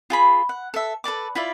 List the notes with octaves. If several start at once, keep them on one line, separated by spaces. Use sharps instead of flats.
F4 G#4 B5
F#5
A4 E5
A4 B4 D5 D6
E4 F4 D5 E5